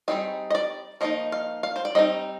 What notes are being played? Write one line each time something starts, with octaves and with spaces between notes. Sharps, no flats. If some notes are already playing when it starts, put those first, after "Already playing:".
G3 C4 D#4 G#4
D#5
D5
F3 A#3 D#4 D#5
F5
F5
C5
D5
G3 C4 D#4 D#5